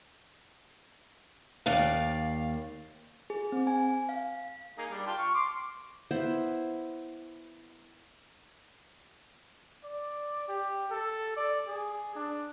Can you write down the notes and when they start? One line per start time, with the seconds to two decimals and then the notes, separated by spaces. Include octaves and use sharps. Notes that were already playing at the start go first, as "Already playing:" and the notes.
1.66 D#2 D5 F5
3.30 G#4
3.52 C4
3.67 G#5
4.09 F5
4.78 A#3 D#4 G#4
4.91 G3 D4
5.06 F4 G5 A5
5.18 C#6 F6
5.34 C6 D6
6.11 B3 E4 C5
9.84 D5
10.48 G4
10.91 A4
11.36 D5
11.67 G#4
12.15 D4